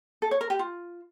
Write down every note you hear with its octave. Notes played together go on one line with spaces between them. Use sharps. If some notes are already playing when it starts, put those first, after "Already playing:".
A4
C#5
A#4
G4
F4